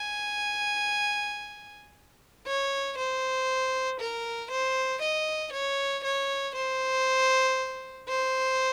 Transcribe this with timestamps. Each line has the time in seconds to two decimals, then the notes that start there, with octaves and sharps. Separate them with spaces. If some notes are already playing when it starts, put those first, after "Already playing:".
Already playing: G#5
2.47 C#5
2.97 C5
4.00 A#4
4.51 C5
5.02 D#5
5.53 C#5
6.04 C#5
6.55 C5
8.09 C5